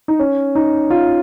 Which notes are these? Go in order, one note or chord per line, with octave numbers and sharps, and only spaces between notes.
D#4
C#4
D#4
F4